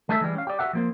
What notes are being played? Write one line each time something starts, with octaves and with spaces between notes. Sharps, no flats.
G#3 A3 D#4 A4 D#5 E5
E3 F3 G3 G#3
C#4 F5
G4 D5
F#4 G4 A4 E5 F#5
F3 A#3 C4